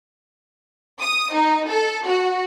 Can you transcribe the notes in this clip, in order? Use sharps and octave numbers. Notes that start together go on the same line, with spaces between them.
D#6
D#4
A4
F#4